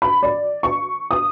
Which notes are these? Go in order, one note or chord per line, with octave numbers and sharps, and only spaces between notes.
B5
D5
C#6
D#6